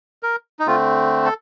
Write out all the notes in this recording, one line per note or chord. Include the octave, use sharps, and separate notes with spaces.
A#4
D#4
D3 A3 C4 F4
A4